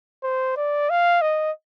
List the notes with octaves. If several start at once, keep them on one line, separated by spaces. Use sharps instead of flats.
C5
D5
F5
D#5